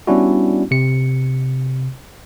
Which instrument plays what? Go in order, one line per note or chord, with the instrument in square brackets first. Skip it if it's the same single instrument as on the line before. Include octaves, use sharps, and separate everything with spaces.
[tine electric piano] G3 B3 C#4 D4 E4 F#4
C3 C#7